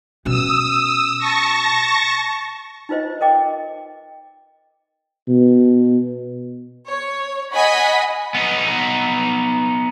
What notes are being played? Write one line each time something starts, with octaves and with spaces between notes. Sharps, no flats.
B2 C#4 D#6 E6
A5 C#6 A#6
D#4 F4 B4 C5 D#5
A#4 D#5 G5 D6
B2
C#5
D#5 F#5 G#5 B5 D#6 B6
B3 D#4